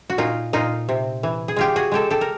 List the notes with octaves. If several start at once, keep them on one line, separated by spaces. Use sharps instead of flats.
F#4
A#2 D#4 F4
A#2 D#4 F4
C3
E3
G#4
G#3 F4 G4
F#4 G#4
G#3 G4 A4
G4 A4
A#4